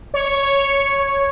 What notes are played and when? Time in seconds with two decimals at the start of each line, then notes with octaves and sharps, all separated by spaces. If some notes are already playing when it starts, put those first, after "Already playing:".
0.14 C#5